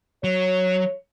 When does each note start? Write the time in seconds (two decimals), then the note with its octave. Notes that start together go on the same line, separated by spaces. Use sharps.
0.24 F#3 C#5